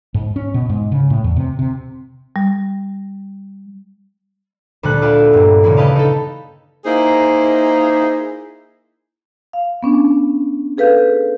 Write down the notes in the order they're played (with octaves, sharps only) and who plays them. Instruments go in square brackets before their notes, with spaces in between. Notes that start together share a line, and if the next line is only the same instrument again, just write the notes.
[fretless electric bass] G#2
C#4
B2
G#2
C#3
A2
E2
C3
C3
[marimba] G3
[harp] D2 A#2 G3 A4 F#6
E4 F4 G4 D5 E5 F#5
G2 A#3
A#2 C#3 E3 E4 G#4
E4 G4 B4 D#5 F5 A5
D#4 A4
[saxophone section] A#3 D#4 E4 G#4 C5
[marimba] F5
B3 C#4 D4
G#4 A4 B4 F5 G6